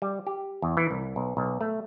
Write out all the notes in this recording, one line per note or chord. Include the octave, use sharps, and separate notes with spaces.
G3
G4
E2
E3
C2
B1
B1
A3